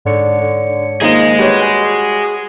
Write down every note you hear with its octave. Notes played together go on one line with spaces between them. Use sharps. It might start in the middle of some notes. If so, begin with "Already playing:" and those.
G#2 D3 C#5 C#7
D3
D#3 F3 A#3 D#4 G#4 C5 D#5
G3 F#4 B4 C#5
G#5